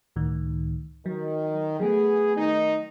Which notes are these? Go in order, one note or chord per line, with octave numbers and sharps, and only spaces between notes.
C#2 A2 D#3
D#3 F#3
F#3 A3 B3 G#4
D#3 D#4